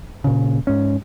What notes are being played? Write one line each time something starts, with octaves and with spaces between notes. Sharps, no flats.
A#2 C#3
G#2 C#4